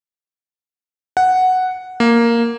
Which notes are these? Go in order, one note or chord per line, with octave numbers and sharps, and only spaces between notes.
F#5
A#3